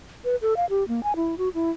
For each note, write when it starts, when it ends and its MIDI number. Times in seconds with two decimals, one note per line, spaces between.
0.25 0.36 71
0.42 0.56 69
0.57 0.65 77
0.70 0.86 67
0.88 1.03 58
1.03 1.16 80
1.16 1.35 64
1.38 1.49 66
1.54 1.70 64